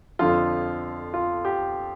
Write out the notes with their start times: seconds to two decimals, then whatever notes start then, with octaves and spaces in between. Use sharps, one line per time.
0.19 F2 D3 F3 F4
1.14 F4
1.45 G4